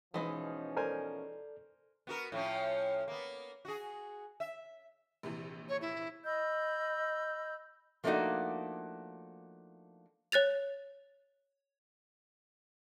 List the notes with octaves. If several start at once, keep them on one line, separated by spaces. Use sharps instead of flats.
B2 E3 F3 G#3 C#4 D#4
A4 A#4 C5 D5 G#5
B3 F#4 A#4
A2 F3 C#4
A#3 B3
F#4 G#4
E5
A#1 C3 E3
C#5
E4
D#5 B5 E6 G6
F3 A3 A#3 D4 D#4 F#4
C#5 F#6 A6 F7